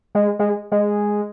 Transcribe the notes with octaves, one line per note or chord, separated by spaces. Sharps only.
G#3
G#3
G#3